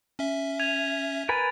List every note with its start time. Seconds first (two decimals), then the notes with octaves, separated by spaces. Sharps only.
0.19 C#4 E5
0.59 G#6 D#7 F7
1.29 A#4 B4 G#5 A6